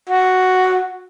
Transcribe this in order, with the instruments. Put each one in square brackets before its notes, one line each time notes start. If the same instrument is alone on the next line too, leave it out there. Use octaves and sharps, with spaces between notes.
[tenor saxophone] F#4